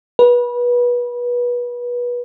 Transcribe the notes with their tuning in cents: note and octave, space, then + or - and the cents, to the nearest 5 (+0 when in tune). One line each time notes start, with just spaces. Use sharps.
B4 -25